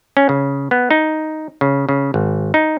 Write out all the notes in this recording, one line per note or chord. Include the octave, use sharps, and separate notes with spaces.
C#4
C#3
B3
D#4
C#3
C#3
G#1
D#4